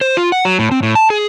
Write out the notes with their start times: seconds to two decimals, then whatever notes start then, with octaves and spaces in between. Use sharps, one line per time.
0.01 C5
0.17 F4
0.32 F#5
0.45 F#3
0.59 A2
0.71 C4
0.83 A2
0.95 A5
1.10 G#4